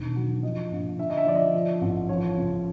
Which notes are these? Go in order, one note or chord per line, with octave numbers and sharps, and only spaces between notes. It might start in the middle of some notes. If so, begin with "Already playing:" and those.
Already playing: E1 D#3
F#3
F3 D#5
A#1
D3 E5
D#5
E5
F3 D5
D#5
F3
A1
F3 C#5
C#2